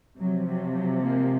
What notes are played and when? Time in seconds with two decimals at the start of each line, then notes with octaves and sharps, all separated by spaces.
0.19 C3 F3 F#3
0.47 F#3
0.75 F#3
1.03 G#3 A#3